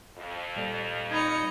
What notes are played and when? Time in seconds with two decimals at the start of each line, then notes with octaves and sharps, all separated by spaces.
0.17 F2
0.56 A#2 G3 A4 D5 F7
1.11 D#4 B5 G#6 C#7